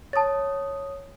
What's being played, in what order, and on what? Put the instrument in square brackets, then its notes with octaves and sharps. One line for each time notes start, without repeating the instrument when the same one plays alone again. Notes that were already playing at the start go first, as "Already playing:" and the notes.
[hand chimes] C#5 D#6 [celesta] A5 A6